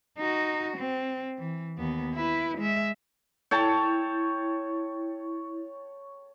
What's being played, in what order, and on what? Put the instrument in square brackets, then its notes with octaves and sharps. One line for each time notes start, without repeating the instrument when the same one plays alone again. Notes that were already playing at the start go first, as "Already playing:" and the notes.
[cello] D#4 F#4
C4
E3
D#2 B3
E4 B4
G#3 E5
[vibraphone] E4 [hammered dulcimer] C#5 G5 A5